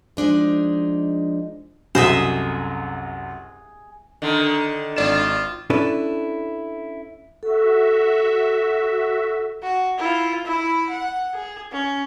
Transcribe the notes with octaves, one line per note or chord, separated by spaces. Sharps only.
F3 G#3 D4 D#4
C2 F#2 F#4 G#4 A4 C5 D#5 E5
D3 D#3
G#1 F4 D5 E7
C#4 D4 E4 A4 B4
F#4 A4 E5
F#4
E4 F4
E4 B5
F#5
G#4
C#4